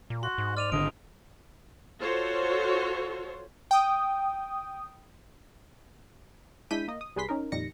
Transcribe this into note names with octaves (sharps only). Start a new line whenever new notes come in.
A#2
F#4 C6
G#2
D5 F6 D#7 F7
G#1 D3 D#5 D7
F4 F#4 A4 C5 C#5
G5 D#6
G#3 D4 E4 G6 B6 D#7
A#3 D#5
D#6
C2 G3 G#4 B4 C6 B6
C#4 D#4 A#4
F2 A#2 D#3 G3 A#6 C#7